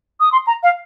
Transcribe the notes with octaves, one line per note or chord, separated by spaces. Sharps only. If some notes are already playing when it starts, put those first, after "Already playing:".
D#6
C6
A#5
F5